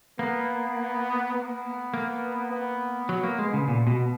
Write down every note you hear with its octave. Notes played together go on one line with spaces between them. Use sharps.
A#3 B3
B3
A#3
B3
F#3
A#3
G#3
C#3
A#2 B3
B2